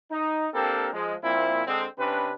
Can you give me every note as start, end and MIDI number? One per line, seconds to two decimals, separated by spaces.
0.11 0.47 63
0.54 0.89 58
0.54 0.89 60
0.54 0.89 62
0.54 0.89 67
0.54 0.89 69
0.54 0.89 70
0.93 1.15 53
0.93 1.15 56
1.23 1.64 46
1.23 1.64 53
1.23 1.64 58
1.23 1.64 60
1.23 1.64 64
1.66 1.86 50
1.66 1.86 56
1.66 1.86 60
1.98 2.33 48
1.98 2.33 61
1.98 2.33 62
1.98 2.33 71